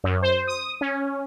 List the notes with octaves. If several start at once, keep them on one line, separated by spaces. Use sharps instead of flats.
F#2
C5
D#6
C#4